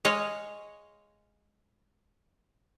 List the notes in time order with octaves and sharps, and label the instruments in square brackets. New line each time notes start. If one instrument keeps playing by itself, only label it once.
[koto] G#3 C#5 D#5 F5